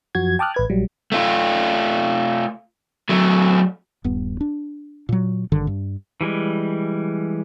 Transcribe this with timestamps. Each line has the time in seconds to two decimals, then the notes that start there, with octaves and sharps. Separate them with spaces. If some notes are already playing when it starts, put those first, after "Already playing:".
0.15 F#2 F3 F#4 G#6
0.39 G5 A5 D6 D#6 F6 F#6
0.54 A1 B4 G#6
0.70 A#1 F#3 G3
1.12 A3 F4
3.09 F#3 A3
4.04 D#1 G2 B3
4.41 D4
5.09 A#2 F#3
5.52 G#1 G2 D3 D#3
5.67 G2
6.21 E3 G3 G#3